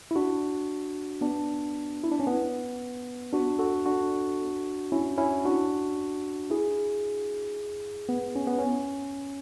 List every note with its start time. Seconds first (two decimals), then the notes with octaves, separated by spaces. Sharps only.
0.11 E4
0.16 D4 F#4
1.21 B3 D4
2.04 E4
2.12 D4
2.20 C#4
2.27 B3
3.33 D4 F#4
3.59 F#4 A4
3.86 D4 F#4
4.92 C#4 E4
5.18 C#4 E4
5.45 D4 F#4
6.50 E4 G#4
8.09 B3
8.36 C#4
8.47 B3
8.58 C#4